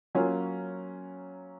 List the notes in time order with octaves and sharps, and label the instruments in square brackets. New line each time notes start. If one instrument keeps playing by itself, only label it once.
[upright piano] F#3 A#3 C#4 F4